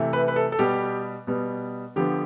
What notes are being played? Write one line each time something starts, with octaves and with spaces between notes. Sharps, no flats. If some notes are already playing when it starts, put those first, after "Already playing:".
Already playing: C3 E3 A3
B4
B4
A4
A4
B2 G3 B3 G4
B2 G3 B3
D3 F3 B3 G4